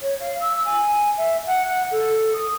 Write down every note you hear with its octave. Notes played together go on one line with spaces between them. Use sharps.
C#5
F5
E6
G#5
E5
F#5
F#5
A4
D#6